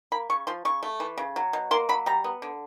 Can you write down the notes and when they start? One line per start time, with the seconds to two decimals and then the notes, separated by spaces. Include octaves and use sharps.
0.12 A#3 B5
0.30 C#3 C#6
0.47 F3 C6
0.65 C#3 C#6
0.83 A3
1.00 E3
1.18 C#3
1.36 F#3
1.53 B2
1.71 A#3 C6
1.89 F#3 B5
2.06 G3 A#5
2.24 B3
2.42 D3